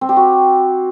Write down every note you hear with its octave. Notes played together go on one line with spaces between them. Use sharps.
C4
G4
F#4